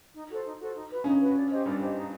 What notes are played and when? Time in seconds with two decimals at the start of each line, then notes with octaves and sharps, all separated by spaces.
0.14 D#4
0.29 F#4 A4 C5
0.44 D#4
0.60 F#4 A4 C5
0.75 D#4
0.90 F#4 B4
1.04 C#3 C#4 D#4
1.20 F#4 B4
1.35 D4
1.50 G4 C5 D#5
1.65 G2 G3 D4
1.80 G4 C5 D#5
1.96 D#4